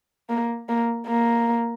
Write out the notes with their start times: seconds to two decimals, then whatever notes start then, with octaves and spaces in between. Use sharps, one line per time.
0.29 A#3
0.69 A#3
1.07 A#3